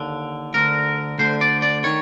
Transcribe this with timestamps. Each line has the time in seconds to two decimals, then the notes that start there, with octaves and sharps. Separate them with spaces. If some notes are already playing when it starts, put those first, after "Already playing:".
Already playing: D#2 D3
0.54 D2 D3 A#4
1.19 D2 D3 C5
1.41 D5
1.62 D5
1.84 D#3 C#5